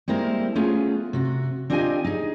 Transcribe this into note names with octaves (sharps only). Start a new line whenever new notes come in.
G3 G#3 A#3 C4 E4 A#4
A3 B3 C#4 F4 G#4
C3 F#4
C4 D4 F4 G4 D#5 G#5
D#4 G#4